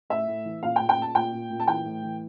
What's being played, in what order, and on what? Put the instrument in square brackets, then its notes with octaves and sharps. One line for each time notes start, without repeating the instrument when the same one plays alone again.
[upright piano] A2 E5
A2
E3
A#2 F5
G5
A#2
G5
A#2 A5
A#2 G5
A#2
A#2
A5
E3 G5
A2
E3